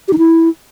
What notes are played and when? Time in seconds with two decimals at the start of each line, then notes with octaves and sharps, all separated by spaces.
0.08 G4
0.13 D#4
0.18 E4